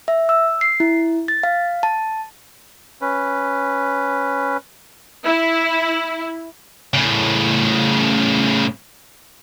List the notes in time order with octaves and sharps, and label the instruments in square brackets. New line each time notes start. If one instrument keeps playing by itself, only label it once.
[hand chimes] E5
E6
C7
E4
A6
F5
A5
[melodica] C#4 B4
[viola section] E4
[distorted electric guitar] A2 C#3